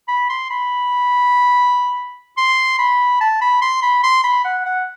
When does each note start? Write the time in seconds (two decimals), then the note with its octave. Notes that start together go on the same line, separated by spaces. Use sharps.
0.08 B5
0.30 C6
0.50 B5
2.37 C6
2.79 B5
3.21 A5
3.41 B5
3.62 C6
3.83 B5
4.03 C6
4.24 B5
4.45 F#5
4.66 F#5